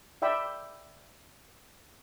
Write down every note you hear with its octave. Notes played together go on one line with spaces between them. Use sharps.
D5 E5 G5 B5 E6